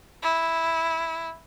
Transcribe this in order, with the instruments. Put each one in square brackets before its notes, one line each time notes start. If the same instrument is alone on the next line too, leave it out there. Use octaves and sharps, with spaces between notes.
[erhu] E4